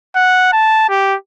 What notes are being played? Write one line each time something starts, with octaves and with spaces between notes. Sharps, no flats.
F#5
A5
G4